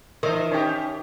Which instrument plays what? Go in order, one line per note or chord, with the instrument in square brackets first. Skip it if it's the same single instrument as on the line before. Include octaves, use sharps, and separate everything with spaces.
[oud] D#3 [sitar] E3 C5 [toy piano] A#4 E5
[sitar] C#4 G4 [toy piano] D#4 G5